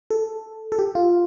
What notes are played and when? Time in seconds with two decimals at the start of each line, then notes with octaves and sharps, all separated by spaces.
0.10 A4
0.72 A4
0.79 G4
0.95 F4